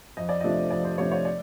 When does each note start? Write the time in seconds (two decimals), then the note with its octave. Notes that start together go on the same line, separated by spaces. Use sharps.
0.17 F2 D#5
0.29 D5
0.41 C3 F3 A3 D4 D#5
0.71 F2 D5
0.85 C5
0.98 C3 F3 A3 D4 C#5
1.11 C#5
1.25 D5